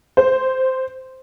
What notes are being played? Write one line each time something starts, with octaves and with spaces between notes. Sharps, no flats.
C5